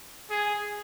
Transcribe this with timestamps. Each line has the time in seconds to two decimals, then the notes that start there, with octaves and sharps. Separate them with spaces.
0.30 G#4